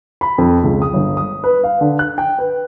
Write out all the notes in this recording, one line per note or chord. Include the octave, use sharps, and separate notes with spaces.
B5
F2
C#2
D#6
G1
D#6
B4
F5
D3
F#6
G5
B4